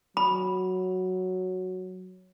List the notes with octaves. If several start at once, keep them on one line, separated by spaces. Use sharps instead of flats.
F#3 B5